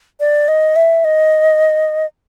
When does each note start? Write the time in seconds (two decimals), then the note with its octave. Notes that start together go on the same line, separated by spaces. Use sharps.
0.20 D5
0.48 D#5
0.76 E5
1.05 D#5